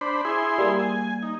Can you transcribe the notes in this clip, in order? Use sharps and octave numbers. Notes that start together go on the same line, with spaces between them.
D4 C5 B5
E4 G#4 C6
G3 A#3
G#5
D#4